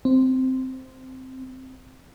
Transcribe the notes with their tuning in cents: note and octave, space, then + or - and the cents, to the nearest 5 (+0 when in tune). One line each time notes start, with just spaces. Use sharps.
C4 -5